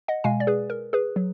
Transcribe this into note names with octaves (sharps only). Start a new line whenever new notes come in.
D#5 F#5
B2 G#3 F5 G#5
D5
G#4 B4
A#4
G#4 B4
F#3